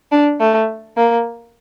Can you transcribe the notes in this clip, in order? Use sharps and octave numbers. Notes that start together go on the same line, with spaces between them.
D4
A3
A#3